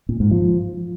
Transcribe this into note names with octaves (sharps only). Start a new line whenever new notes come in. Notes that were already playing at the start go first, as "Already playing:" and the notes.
A#2
G#2
F3